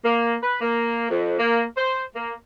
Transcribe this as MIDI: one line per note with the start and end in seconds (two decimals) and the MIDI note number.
0.04 0.34 58
0.42 0.57 71
0.61 1.07 58
1.09 1.38 41
1.39 1.62 58
1.77 2.02 72
2.15 2.34 58